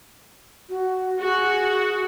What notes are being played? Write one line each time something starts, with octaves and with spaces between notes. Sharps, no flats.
F#4
F#4 G#4